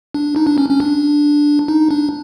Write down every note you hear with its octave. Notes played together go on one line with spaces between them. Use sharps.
D4
D#4
D4
C#4
C#4
D4
D#4
D4